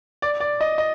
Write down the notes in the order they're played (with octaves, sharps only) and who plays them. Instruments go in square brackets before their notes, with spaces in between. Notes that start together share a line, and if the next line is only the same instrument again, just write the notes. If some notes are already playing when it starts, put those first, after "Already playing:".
[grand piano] D5
D5
D#5
D#5